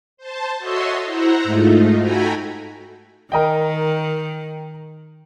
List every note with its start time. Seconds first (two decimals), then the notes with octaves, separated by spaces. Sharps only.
0.17 C5 A5
0.58 F#4 A4 C#5 D#5 E5 C6
1.05 E4 C5 E5 F#5 A#5
1.44 G#2 A3 D#4 F4
1.98 F#4 A4 G5 G#5 A#5 B5
3.32 D#3 A#4 D#5 G5